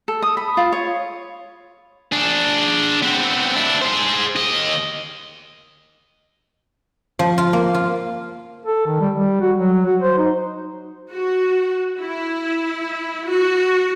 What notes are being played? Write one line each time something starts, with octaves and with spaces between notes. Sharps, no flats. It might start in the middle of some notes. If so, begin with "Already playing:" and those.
A4
D#6
B5
F4
C#5
D4 G#4
B3 C4
D4 E4
G#4 C5
D#2 D#5
F3
F4
A#3
F4
A4
D#3
G3
G3
F#4
F#3
F#4
C5
D#4
F#4
E4
F#4